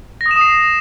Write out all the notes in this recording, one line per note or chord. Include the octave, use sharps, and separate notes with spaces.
A#6
D#6
E7
D#6
C7